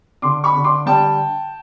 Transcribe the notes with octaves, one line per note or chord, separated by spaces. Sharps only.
D3 C6 D6
B5 C#6
D3
C6 D6
G3 G5 A5